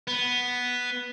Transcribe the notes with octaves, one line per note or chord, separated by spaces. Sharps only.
B3